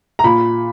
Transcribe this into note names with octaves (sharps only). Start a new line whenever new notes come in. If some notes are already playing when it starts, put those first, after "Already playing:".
A#5
A#2 B5